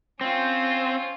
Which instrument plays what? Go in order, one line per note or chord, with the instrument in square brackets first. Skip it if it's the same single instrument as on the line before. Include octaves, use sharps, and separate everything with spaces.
[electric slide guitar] C4 [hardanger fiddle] C#4 F4